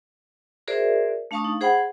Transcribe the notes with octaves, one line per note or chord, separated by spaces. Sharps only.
F#4 G#4 A#4 C5 D5 E5
A3 D4 F5 A5 C#6 D#6
D#4
G#4 C5 F#5 G5 B5